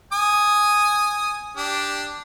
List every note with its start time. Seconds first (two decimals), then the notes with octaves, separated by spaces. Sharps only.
0.13 G#5 D#6
1.57 D4 G4